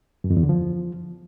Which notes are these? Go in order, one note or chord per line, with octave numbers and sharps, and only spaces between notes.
F#2
F2
E2
D3
F3